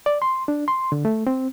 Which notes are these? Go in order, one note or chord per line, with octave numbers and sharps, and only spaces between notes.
D5
C6
D4
C6
D3
A3
C4